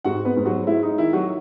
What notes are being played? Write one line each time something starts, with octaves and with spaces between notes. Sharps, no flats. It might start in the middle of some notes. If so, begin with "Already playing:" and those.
G#2 F#4 F#5
B3 B4
G#2
F#3 F#4
G#3 E4
D#4
D#3 E4
F#3 F#4